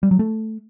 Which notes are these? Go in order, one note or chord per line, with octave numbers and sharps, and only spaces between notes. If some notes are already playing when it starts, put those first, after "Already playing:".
G3
F#3
A3